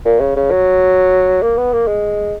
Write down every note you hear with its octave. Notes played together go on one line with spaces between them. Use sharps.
A#2
C#3
C#3
F#3
A#3
B3
A#3
G#3